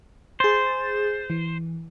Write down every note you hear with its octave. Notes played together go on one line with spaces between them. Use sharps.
G#4 C5 A6
E3